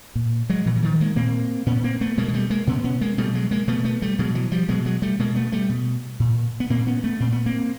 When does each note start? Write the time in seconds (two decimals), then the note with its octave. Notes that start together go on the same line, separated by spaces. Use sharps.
0.15 A#2
0.50 F#3 G#3
0.66 A#2 E3 F#3
0.76 F#3
0.83 D#3 F3
1.00 G#3 A#3
1.16 A#2 A#3 C4
1.66 A#2 B3 C#4
1.84 A#3 C4
2.01 A3 B3
2.18 B2 G#3 A#3
2.28 G#3
2.34 G3 A3
2.50 G#3 A#3
2.67 B2 B3 C#4
2.84 B3 C#4
3.01 G#3 A#3
3.18 B2 G3 A3
3.34 F#3 G#3
3.51 G#3 A#3
3.68 B2 A3 B3
3.85 A3 B3
4.02 G3 A3
4.19 B2 F#3 G#3
4.35 E3 F#3
4.52 F3 G3
4.69 B2 F#3 G#3
4.86 F#3 G#3
5.02 G3 A3
5.19 B2 G#3 A#3
5.35 A3 B3
5.52 G3 A3
5.69 B2
6.20 A#2
6.60 B3
6.70 A#2 A#3 C4
6.87 B3 C#4
7.04 A3 B3
7.20 A#2 C4
7.32 B3
7.46 A#3 C4